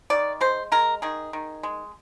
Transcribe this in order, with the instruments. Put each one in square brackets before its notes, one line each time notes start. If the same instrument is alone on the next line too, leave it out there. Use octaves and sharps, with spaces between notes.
[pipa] D#3 D5
G#3 C5
G#3 A#4
D#3 G#4
D#3
G#3